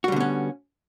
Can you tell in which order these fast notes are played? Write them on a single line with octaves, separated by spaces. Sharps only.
F#4 G3 D3 B3 C#4